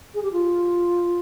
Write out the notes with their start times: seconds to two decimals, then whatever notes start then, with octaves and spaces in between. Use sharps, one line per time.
0.15 G#4
0.23 G4
0.32 F4